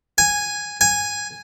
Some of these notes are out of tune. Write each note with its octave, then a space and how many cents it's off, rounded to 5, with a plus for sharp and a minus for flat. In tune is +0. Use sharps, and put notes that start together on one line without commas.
G#5 -5
G#5 -5